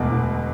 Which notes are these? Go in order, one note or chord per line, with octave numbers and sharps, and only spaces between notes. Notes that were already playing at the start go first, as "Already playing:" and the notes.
Already playing: E1 D2 B2 D6
E1